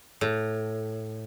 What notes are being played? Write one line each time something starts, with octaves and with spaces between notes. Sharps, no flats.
A2